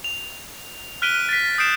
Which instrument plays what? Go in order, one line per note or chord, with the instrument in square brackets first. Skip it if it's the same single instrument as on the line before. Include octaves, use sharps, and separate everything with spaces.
[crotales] F7
F6 F#6 B6 D7 D#7 G7
A6 B6
D#6 G6 B6 C7 D7 E7